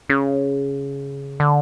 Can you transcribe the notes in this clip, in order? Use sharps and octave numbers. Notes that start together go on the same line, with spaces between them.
C#3
D3